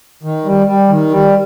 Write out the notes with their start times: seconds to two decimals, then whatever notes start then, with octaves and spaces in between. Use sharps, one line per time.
0.23 D#3
0.45 G3
0.66 G3
0.89 D#3
1.10 G3